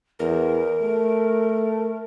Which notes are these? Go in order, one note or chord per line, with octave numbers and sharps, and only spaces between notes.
E2 A#4
A3